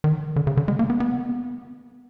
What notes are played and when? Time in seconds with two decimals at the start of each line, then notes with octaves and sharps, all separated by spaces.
0.04 D#3
0.36 D3
0.47 C#3
0.57 D3
0.68 G#3
0.79 A#3
0.90 B3
1.00 B3